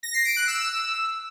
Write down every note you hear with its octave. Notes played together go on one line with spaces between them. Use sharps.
A#6
C7
D7
F#6
E6